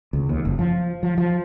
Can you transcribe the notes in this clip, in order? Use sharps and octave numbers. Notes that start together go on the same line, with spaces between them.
C#2
D#2
F#1
F3
F3
F3